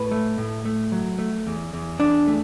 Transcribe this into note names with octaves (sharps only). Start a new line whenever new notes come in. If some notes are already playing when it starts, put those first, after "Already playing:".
Already playing: A2 B4
A3
A2
A3
F#3
A3
E2
E2
E2 D4
A3